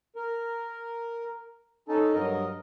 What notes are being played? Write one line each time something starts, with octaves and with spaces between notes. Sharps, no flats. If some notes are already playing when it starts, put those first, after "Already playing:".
A#4
C#4 D#4 A4 A5
G2 F#3 A#4 D#5